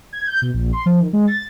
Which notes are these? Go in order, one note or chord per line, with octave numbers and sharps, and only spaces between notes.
G#6
G6
B2
A#1
C6
F3
D#3
G#3
A6